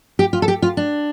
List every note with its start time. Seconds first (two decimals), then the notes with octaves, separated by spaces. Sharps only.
0.19 G4
0.33 F4
0.42 A4
0.48 G4
0.62 F4
0.77 D4